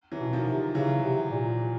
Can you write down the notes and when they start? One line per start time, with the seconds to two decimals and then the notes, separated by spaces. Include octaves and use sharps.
0.12 E3 F#3
0.19 B2
0.33 D#3 F3
0.36 B2
0.47 C3
0.74 C#3 E3 F#3
1.04 C3
1.31 A#2